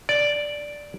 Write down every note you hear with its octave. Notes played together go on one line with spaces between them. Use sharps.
D5